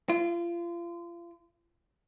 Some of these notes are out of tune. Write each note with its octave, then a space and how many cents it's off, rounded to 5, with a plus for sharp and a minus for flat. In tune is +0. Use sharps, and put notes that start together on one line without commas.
F4 -30